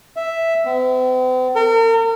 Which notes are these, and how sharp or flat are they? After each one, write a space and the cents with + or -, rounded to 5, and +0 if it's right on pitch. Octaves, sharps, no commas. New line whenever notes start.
E5 +0
C4 -45
A#4 -40